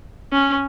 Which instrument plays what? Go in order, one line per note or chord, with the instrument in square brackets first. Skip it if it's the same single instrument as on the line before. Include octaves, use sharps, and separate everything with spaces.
[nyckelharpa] C#4